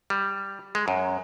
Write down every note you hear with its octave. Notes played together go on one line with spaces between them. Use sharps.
G3
G#3
F#2